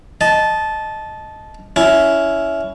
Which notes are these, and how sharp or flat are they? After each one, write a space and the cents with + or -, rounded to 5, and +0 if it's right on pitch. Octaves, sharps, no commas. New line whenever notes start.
D#5 +0 A5 -15
C#4 +15 E4 +0